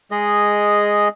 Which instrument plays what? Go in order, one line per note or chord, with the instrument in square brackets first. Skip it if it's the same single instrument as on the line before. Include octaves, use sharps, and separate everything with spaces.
[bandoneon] G#3 G#4 D#5